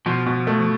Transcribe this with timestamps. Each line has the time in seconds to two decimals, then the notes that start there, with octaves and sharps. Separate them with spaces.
0.06 B2 F3
0.26 B2
0.47 A3